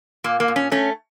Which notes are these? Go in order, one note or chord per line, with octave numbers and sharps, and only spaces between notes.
A#2 A#3
A#3
A#2
C#4
A3 C#4